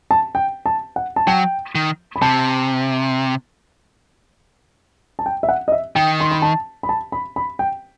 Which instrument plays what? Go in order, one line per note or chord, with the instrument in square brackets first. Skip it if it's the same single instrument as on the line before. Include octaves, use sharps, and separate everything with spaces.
[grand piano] A5
G5
A5
F#5
A5
[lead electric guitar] F#3 [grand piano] G5
[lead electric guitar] D#3
[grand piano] B5
[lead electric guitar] C3 [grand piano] A5
[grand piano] A5
G5
E5
F#5
D#5
E5
[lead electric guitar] D#3 [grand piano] G5
[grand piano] C6
B5
A5
B5
A5
B5
B5
G5